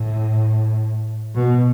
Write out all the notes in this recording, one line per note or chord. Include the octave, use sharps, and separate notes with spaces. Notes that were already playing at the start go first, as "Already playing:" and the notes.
Already playing: A2
B2